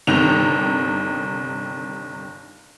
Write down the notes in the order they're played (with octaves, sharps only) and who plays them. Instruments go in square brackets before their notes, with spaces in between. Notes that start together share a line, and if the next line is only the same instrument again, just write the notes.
[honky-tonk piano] G1 C3 D#3 D#4 F7